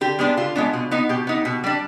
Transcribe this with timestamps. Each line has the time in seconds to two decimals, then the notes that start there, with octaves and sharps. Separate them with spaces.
0.01 D3 G4
0.19 G#3 B3 D4
0.37 D3 F4
0.56 G#3 B3 D4
0.73 B2
0.91 B3 D#4
1.09 B2 G4
1.27 B3 D#4
1.45 B2
1.64 G3 D4